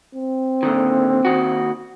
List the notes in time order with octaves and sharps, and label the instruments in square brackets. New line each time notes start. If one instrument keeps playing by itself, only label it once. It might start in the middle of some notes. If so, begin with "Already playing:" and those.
[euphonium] C4
[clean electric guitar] A#2 D3 D#3
D#2 D#3 F#4